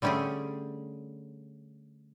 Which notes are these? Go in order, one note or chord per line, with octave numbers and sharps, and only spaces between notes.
D3 G3 A3 C#4 G4 G#4